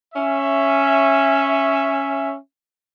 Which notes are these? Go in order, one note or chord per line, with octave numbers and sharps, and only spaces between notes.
C#4 E5